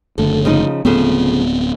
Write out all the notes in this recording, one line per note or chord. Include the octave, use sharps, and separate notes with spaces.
F#1 D3 A3 A4
C#3 F3 D#4
D1 C#3 F3 A3 B3 C4